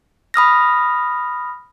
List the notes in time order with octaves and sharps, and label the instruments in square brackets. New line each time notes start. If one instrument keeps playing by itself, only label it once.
[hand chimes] B5 D#6 F6 A#6